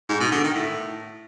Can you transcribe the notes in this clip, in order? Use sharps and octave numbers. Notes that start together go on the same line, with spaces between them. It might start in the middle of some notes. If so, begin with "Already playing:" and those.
G#2
B2
D3
D#3
A2